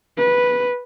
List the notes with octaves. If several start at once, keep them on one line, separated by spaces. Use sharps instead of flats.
B4